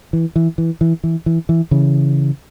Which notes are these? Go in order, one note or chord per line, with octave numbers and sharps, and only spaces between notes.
E3
E3
E3
E3
E3
E3
E3
C#3 E3